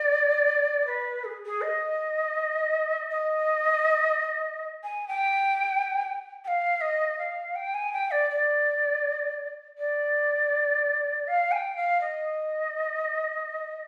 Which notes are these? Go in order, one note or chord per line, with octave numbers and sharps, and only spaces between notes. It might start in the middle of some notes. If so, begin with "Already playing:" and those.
Already playing: D5
B4
G#4
G#4
D#5
D#5
G#5
G5
G5
F5
D#5
F5
G5
G#5
G5
D5
D5
D5
F5
G#5
G5
F5
D#5